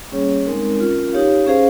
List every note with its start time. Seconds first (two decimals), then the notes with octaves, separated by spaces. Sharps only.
0.12 G3 A#3 C#4 G#4 C#5
0.46 G#3 C4 D#4 A#4
0.79 C#4 F4 A#4
1.13 D#4 G4 C#5 F5
1.46 C#4 G#4 C5 F5